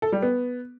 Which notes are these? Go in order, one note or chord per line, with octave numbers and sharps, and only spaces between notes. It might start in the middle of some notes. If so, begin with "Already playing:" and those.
A4
G3
B3